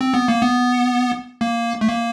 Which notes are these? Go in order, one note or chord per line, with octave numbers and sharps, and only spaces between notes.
C4
B3
A#3
B3
A#3
A3
A#3